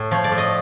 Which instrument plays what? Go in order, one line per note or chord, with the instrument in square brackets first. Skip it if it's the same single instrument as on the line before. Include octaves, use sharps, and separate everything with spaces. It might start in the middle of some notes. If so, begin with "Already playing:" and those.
Already playing: [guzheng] A2
F3 C#5
D5
A2
D#5